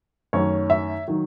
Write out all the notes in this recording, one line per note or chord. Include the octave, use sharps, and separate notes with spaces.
F#2 D#3 A3 C#5
E5
D#3 F#3